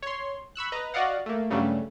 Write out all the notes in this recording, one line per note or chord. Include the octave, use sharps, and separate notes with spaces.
C#5 C6
B5 C#6 E6 F#6
B4 D#5 A#5
F#4 D5 D#5 F5 F#5
A3 A#3
G2 C#3 F#3 G3 A3